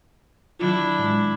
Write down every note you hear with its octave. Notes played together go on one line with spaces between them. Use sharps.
D#3 F#3 D4 E4 F4
A2 D#3 G#3